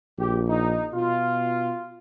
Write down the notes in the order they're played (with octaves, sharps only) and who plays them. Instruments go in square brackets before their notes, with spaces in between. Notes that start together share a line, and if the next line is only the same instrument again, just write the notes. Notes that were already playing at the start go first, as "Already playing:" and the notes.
[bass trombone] A#1 [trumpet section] G4
[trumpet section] D#4
[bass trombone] B2 [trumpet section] F4